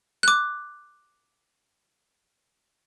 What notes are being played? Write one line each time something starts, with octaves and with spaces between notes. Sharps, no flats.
D6 F#6